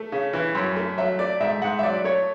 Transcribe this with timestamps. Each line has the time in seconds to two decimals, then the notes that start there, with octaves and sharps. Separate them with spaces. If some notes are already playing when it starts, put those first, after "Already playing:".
Already playing: A3
0.12 C#3
0.33 E3
0.55 F#2
0.76 A3
0.98 F#3 E5
1.19 A3 D5
1.40 G#2 E5
1.62 G#2 F#5
1.79 E5
1.83 F#3 D5
2.04 A3 C#5